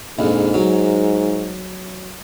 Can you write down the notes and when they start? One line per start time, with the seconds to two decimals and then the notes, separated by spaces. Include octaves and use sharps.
0.19 A#1 F2 G#2
0.54 F#3